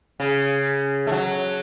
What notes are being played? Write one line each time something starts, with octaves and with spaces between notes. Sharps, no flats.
C#3
A3
F#3